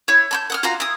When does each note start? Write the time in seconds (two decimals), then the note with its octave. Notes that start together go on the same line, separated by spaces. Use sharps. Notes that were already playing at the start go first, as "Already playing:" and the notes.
0.08 E4 C#5
0.31 A5 B5 G6
0.50 F#5 D#6 F6
0.63 F4 F#4 F5 A#5
0.80 E4 D#6